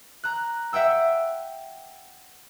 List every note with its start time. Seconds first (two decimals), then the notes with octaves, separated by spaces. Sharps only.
0.24 A#5 F#6
0.73 E5 F#5 G5 E6